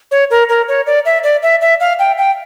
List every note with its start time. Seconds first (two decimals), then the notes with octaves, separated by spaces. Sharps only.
0.11 C#5
0.31 A#4
0.49 A#4
0.68 C#5
0.87 D5
1.05 E5
1.24 D5
1.43 E5
1.61 E5
1.80 F5
1.99 G5
2.18 G5